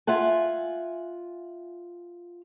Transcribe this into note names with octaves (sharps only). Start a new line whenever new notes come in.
F4 E5 F#5 G#5